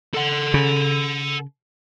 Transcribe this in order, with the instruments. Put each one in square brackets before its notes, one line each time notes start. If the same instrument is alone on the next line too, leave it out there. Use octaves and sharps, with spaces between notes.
[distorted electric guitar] A4 F#5
[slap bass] C#3